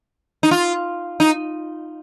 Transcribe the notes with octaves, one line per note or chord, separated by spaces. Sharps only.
D#4
F4
D#4